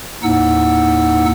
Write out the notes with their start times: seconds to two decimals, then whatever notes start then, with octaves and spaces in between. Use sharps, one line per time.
0.23 D#2 A2 D#4 F#5 E6